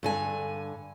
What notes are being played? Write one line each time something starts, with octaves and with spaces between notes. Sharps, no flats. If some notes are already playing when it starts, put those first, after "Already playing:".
G2 D3 G#5